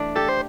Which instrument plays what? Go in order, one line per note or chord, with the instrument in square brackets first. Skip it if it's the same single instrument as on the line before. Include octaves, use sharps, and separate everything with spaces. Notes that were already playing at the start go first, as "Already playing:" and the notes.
Already playing: [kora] E3 A3 D4
[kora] G4 [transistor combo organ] A4
[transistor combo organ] C5